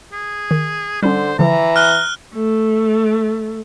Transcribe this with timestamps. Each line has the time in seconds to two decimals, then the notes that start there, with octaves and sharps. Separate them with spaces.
0.13 G#4
0.51 D#3
1.03 D3 G3 C#4 C5
1.39 D3 E3 F3 A#5
1.76 F6 F#6 G7
2.34 A3